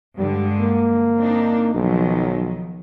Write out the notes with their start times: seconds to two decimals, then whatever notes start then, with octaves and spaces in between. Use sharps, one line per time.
0.18 G2 D3 G3 G#3
0.60 A#3
1.16 C4 D4 D#4
1.74 B1 D#3 F3 F#3